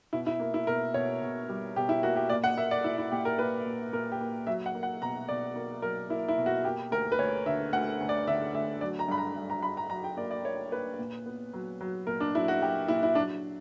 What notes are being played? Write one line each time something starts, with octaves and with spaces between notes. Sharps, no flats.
B2 E4
E4
A#3
E4
B2 A#4
B2 C#5
B2
G3
B2 G4
E4
A#3 F#4
G4
A#2 D5
F#5
A#3 E5
D5
A#2 E4
E4
A#2 G4
A#4
A#3 B4
A#2
A#2 A#4
G4
A#3
F#3 E5
F#5
A#3
F#5
B2 A#5
B2 D5
A#3
F#3 A#4
A#3 E4
E4
B2
F#4
A#3 G4
D2 A#4
B4
D2 C#5
D3 E5
D2 F#5
D2
D5
D3 E5
D2 E5
F#3 D5
A#5
G2 B5
A#5
G2
A#5
G2 B5
A#5
F#3 A#5
G5
A#3 D5
D5
A#3 C#5
A#3 B4
A#2
B3
F#3
F#3
A#2 A#4
D4
F#3 E4
F#4
F#3 G4
A#2 E4
E4
F#3 D4